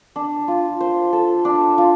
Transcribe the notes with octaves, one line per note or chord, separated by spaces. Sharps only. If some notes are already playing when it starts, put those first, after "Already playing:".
D4
F4
C5
A4
D4
F4